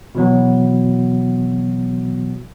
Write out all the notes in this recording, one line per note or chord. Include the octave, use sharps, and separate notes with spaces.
B2 E3 F#3 B3